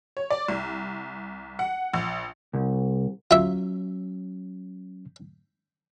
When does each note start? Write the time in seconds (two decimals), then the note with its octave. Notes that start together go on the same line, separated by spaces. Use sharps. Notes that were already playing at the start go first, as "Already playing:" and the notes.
0.17 C#5
0.30 D5
0.48 C2
1.59 F#5
1.94 A#1
2.53 C2
3.31 F#3 C#4 F4 E5